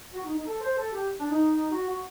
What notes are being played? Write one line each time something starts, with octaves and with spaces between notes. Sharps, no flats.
F#4
D#4
D#4
A4
C5
A4
G4
D4
D#4
F#4
F#4